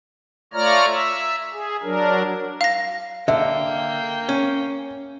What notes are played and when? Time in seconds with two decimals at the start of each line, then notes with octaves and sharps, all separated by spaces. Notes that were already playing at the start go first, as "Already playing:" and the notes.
0.53 A3 F4 C#5 D5 A#5 F6
0.86 E5
1.53 G#4
1.83 F#3 D4 A#4
2.61 F5 A#6
3.28 D3 A#3 E5 G5
4.29 C#4